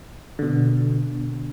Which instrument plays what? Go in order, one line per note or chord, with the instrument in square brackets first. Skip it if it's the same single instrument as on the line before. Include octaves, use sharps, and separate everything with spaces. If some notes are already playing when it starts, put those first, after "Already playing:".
[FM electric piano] B2 D3